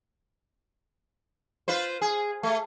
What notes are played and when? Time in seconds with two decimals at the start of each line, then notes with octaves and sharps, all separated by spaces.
1.68 F4 B4 C5
2.01 G#4
2.43 A3